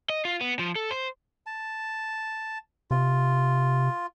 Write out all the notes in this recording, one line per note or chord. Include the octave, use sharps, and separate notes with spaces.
D#5
F4
B3
F3
A4
C5
A5
C3 F4